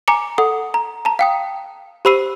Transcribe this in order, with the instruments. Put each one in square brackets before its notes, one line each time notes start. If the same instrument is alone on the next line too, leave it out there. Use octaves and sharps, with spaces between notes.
[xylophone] G#5 A#5 D6 C#7
A4 F#5 D#6
A#5
A5 A#5
F5 G5 D#6
G4 C5 B5 E6 C7 D#7